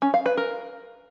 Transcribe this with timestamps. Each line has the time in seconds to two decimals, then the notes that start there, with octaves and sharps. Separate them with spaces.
0.02 C#4
0.14 F5
0.26 B4
0.37 A#4